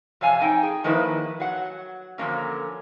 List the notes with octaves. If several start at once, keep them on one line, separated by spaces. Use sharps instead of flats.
F2 C3 C#5 F5 G#5 A5
F2 D#4 G5
G#4
D#3 F3 A#3 E4 B4
F#3 F#5
D3 F3 F#3 A#3 C#4